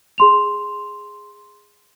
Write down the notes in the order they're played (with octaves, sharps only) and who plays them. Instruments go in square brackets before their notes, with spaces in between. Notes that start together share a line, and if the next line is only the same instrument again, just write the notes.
[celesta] G#4 C6 F7